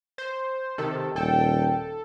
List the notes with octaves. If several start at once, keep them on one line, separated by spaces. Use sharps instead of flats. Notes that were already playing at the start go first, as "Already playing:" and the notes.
C5
C3 D#3 A4
D#1 A4 G5